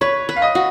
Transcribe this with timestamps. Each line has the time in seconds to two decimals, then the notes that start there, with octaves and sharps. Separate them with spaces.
0.01 B4 C#5
0.29 B4
0.36 F5
0.42 D#5
0.55 F#4